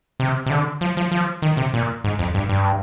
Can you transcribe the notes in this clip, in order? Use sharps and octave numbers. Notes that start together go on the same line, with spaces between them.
C3
C3
D3
F3
F3
F3
D#3
C3
A#2
G#2
F2
G2
G2